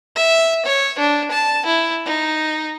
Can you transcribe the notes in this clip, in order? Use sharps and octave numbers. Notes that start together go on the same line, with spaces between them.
E5
C#5
D4
A5
E4
D#4